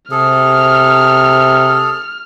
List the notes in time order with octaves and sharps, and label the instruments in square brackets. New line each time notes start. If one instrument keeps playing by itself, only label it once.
[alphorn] C3 [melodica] G#4 A4 [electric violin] F6